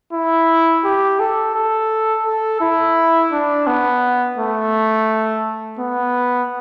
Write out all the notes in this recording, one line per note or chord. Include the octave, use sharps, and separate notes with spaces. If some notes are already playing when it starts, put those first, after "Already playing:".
E4
G4
A4
A4
A4
E4
D4
B3
A3
B3